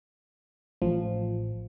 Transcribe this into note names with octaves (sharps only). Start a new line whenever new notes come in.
A1 F3